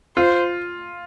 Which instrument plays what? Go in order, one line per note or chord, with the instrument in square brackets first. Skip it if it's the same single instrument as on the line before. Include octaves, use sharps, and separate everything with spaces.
[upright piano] F4 [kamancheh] C5